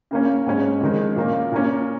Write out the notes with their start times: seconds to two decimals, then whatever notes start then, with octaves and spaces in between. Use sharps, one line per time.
0.11 C#3 A#3 C#4
0.46 G#2 G#3 C#4
0.81 F2 D#3 G#3
1.16 A#2 A#3 C#4
1.52 A#2 A#3 C#4